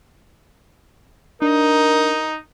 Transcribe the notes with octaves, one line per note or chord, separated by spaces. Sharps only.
D4 D#4 A#4